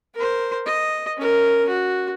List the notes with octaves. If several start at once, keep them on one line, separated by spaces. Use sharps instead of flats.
A#4 C5
D#5
C#4 A#4
F#4